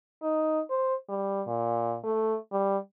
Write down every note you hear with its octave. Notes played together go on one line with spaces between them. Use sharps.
D#4
C5
G3
A#2
A3
G3